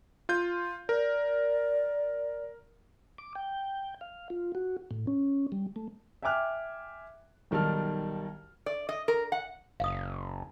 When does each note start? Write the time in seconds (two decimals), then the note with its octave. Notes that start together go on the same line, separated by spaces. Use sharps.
0.29 F4 G6
0.89 A#4 D5
3.18 D6
3.35 G5
4.01 F5
4.30 F4
4.55 F#4
4.91 A2
5.07 C#4
5.52 G3
5.76 A3
6.22 E5 G5 G#5 D6 F6 F#6
7.51 B1 D#3 G3 A5 F6
8.66 D5
8.89 D#5
9.08 A#4
9.32 F#5
9.80 F#1 F5 D#6